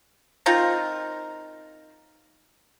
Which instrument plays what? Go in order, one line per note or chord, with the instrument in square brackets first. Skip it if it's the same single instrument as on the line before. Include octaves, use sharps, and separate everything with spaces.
[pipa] C4 D#4 F4 A#4